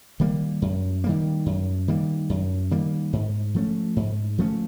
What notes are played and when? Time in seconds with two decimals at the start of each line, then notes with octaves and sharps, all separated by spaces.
0.20 D#3 G3 A#3
0.62 F#2
1.04 D#3 G3 A#3
1.46 F#2
1.88 D#3 G3 A#3
2.30 F#2
2.71 D#3 G3 A#3
3.13 G#2
3.54 F3 A3 C#4
3.96 G#2
4.38 F3 A3 C#4